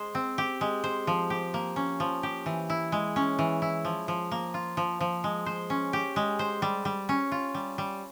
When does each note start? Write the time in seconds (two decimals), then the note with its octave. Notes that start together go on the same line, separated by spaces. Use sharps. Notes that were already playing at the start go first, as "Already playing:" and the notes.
Already playing: G#3 C5
0.15 C4
0.38 G4
0.61 G#3
0.84 C5
1.07 F3
1.30 G4
1.54 A#3
1.76 C#4
2.00 F3
2.23 G4
2.46 E3
2.70 E4
2.92 G#3
3.16 C#4
3.39 E3
3.62 E4
3.85 F3
4.08 F3
4.31 A#3
4.54 F4
4.77 F3
5.01 F3
5.24 G#3
5.46 C5
5.70 C#4
5.93 G4
6.16 G#3
6.39 C5
6.62 G3
6.85 G3
7.09 C#4
7.32 F4
7.55 G3
7.78 G3